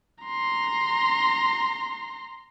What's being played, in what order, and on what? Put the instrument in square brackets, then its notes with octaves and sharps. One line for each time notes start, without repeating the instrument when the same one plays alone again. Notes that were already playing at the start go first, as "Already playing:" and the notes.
[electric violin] A#5 C6